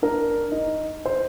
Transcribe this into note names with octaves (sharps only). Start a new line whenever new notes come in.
D4 A#4
D#4
C5